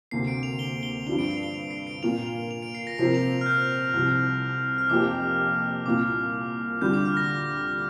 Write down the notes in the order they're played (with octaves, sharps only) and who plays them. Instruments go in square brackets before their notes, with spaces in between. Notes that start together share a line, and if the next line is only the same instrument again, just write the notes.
[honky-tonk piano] D2 C3 A#3 [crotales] C7
[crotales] D7
F7
G7
G7
[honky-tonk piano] G2 F3 D4 [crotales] F7
[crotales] D7
C7
F7
G7
F7
C7
D7
[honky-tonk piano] A#2 A#3 F4 [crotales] F7
[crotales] F7
F7
D7
C7
A#6
[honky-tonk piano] C3 F3 C4 F4 A#4 [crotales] C7
[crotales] F7
F6
G6
[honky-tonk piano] C2 C3 F3
[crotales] F6
[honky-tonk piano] F1 F2 F3 A#3 G4 [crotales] D6
[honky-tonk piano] C2 A#2 A#3 F4 [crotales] D6
[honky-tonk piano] D2 D3 G3 D4 F4 [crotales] G6
[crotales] D6
F6
A#6